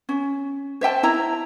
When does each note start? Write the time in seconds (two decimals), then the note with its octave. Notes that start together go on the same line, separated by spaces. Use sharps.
0.09 C#4
0.81 C5 E5 G5 A5
1.03 E4 A#5